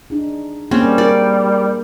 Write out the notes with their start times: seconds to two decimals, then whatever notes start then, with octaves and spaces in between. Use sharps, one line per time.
0.10 D4 D#4 G#4
0.71 G3 A#3 C4 C#4 G#4
0.98 A#4 D5